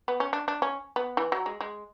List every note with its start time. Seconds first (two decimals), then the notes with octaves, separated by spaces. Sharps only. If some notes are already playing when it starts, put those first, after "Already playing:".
0.08 B3
0.20 C#4
0.33 D4
0.48 D4
0.62 C#4
0.96 B3
1.17 E3
1.32 F#3
1.46 G#3
1.61 G#3